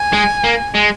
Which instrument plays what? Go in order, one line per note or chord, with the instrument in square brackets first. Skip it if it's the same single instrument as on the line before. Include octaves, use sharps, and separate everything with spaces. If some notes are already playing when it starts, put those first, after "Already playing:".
Already playing: [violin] G#5
[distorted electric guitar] G#3
A#3
G#3